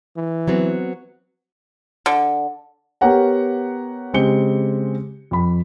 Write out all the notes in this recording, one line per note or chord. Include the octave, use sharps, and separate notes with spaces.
E3
F#3 B3 C4
D3
B3 G4 A#4 C#5 F#5 A#5
C#3 G#3 C4 G4 C#7 G7
F2 B5